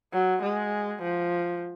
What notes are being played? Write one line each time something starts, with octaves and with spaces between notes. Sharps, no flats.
F#3
G#3
F3